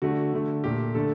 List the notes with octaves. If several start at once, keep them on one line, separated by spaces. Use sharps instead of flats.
D3 A3 F#4
D3 A3
A#2 A3 G4
D3 A3 A4